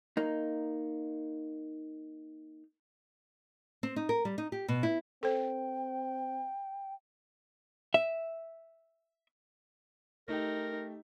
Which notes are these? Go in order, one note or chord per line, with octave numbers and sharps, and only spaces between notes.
A#3 D#4
C4
D#4
A#4
G3
D#4
G4
B2
E4
C4 A4 C5 G5
E5
A3 D#4 G4 A#4